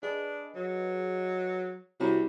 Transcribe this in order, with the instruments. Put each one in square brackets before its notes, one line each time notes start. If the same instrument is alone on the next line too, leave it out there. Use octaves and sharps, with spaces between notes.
[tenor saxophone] D4 [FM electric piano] G#4 B4 D#5
[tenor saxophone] F#3
[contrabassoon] C2 [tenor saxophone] C3 [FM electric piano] F#4 C#5 A#5